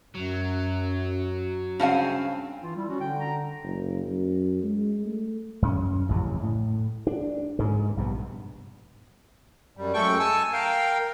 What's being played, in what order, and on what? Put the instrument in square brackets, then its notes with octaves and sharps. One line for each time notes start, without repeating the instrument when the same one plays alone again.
[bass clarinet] F#2 [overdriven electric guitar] F#3
[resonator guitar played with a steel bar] G2 C4 G#5 [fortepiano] C#3 F5 [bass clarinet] C#4
[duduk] E3 [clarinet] F4
[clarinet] G3 [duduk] E4
[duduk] C#4 [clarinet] F#4
[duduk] D3 [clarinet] G5
[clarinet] A#5
[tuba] F#1
F#2
G#3
A3
[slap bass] F#2 C#4
A1 F2 C#3
A2
D4
G#2 G#3
A#1 G2 C3 B3
[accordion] F#2 G3
F#2 G#3 A3 A4 G5 C#6
G#5 A5 E6
A#4 F5 G5